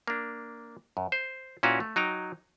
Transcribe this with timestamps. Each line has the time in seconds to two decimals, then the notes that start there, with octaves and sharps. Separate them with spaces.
0.07 A#3 D4
0.97 F#2
1.12 C5
1.63 A#2 C#4 E4 F#4 B4 F5
1.80 A3
1.96 F#3 D#4 G5 A#5